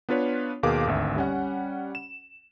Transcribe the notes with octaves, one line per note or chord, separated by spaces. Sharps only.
B3 D4 F4 B4 C#5
D#2 B2 G#4 A#4 F5 D6
G#1 D2 E5
G3 C#4 F#5
E7